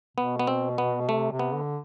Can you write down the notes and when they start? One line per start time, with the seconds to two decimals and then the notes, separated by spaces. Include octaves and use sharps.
0.18 B2 B3
0.39 B3
0.47 C4
0.78 B3
1.09 C3 A3
1.32 C3
1.39 B3
1.54 D3